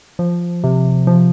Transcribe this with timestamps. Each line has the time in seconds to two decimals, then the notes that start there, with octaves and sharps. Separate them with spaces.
0.19 F3
0.64 C3
1.07 F3